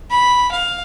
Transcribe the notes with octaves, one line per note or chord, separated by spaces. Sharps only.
B5
F5